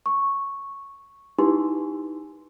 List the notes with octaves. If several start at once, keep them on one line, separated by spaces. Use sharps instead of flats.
C#6
D#4 E4 G4 B4 C6